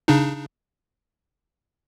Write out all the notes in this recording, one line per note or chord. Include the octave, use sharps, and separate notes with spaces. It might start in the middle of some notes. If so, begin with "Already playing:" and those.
C#3 D4 D#4